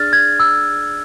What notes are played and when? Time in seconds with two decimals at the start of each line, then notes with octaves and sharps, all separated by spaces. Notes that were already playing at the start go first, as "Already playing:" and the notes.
Already playing: D4 G#4 D5 F6 A6
0.13 G#6
0.40 E6